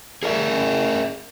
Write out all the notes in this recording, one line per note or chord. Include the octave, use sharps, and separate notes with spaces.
G#4 A#4 D5 E5